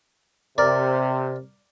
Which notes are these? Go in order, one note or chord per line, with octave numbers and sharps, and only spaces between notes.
C3 A#4 D5